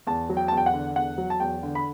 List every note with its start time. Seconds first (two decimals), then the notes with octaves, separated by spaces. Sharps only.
0.07 E2 A5
0.29 F#3
0.37 G5
0.48 E2 A5
0.57 G5
0.66 F#5
0.73 D3
0.96 E2 F#5
1.18 F#3
1.30 A5
1.40 E2 G5
1.63 D3
1.75 B5